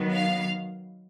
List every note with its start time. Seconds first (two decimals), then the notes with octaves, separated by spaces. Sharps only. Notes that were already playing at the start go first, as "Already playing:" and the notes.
Already playing: D#3 F#3 B3
0.12 F5